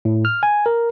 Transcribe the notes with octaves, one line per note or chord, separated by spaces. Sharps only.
A2
F6
G#5
A#4